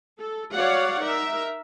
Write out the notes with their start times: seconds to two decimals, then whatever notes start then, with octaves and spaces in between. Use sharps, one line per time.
0.19 A4
0.52 F#4 C#5 D5 F5 F#5
1.00 D#4 A#4 E5